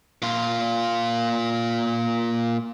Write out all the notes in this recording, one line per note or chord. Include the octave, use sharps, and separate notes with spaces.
A#2 F4